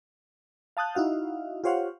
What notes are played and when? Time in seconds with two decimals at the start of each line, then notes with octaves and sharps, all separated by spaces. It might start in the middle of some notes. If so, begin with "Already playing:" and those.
0.77 F5 A5 D#6 F#6 G6
0.95 D#4 E4 F#4 F5
1.64 F4 G4 C5 C#5 F5 F#5